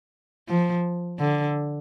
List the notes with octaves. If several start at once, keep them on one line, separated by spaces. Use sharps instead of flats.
F3
D3